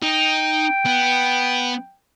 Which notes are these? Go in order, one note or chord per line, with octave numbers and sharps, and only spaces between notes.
D#4 G5
B3